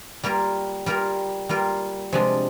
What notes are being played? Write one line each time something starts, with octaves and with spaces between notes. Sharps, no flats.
G3 A#3 F4 A#4
G3 A#3 F4 A#4
G3 A#3 F4 A#4
C3 F3 G#3 D4